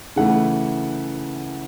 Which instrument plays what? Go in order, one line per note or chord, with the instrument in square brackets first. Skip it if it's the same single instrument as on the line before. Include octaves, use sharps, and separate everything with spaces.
[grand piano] C#3 E3 A3 F#5